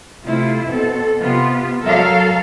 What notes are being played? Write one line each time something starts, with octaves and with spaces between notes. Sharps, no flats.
C3 A3 E4 F4
B2 C4 A4
C3 B3 F4
F#3 A4 A#4 F5